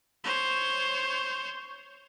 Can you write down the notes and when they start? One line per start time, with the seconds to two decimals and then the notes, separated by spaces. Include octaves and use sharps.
0.24 C5 C#5